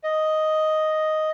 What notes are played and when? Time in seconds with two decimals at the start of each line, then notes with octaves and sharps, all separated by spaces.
0.03 D#5